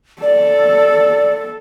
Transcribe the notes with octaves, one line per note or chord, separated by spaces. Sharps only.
A4 D5